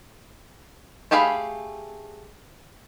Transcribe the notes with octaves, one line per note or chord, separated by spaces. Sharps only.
A3 G4 G#4 F5 B5